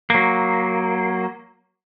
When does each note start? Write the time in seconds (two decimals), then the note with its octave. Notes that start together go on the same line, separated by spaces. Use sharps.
0.10 F#3 A#3